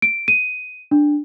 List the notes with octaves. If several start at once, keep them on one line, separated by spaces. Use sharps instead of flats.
D7
D#7
D4